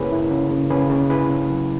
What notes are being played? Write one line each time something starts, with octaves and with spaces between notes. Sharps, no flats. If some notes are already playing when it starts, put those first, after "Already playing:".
Already playing: C#3 A#3 E4 G#4 A#4 B4 C#5
E4
C#3
C#3
C#3 G#4 B4
C#3
E4 G#4 B4
C#3
F#3